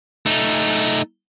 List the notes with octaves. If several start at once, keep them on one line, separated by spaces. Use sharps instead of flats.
A3 D#4